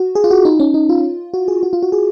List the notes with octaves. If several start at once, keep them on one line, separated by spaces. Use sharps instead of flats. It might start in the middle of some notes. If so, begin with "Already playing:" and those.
Already playing: F#4
G#4
F4
F#4
D#4
C#4
D#4
F4
F#4
G#4
F#4
F4
F#4
G#4